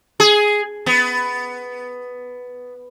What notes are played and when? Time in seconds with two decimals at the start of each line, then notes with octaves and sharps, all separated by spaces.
0.20 G#4
0.86 B3